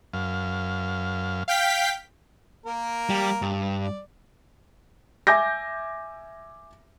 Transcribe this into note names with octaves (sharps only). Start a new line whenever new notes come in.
F#2 F5
F5 G5 B6
A#3 A#4
G3
G2
D5
E5 G#5 D6 G6 A#6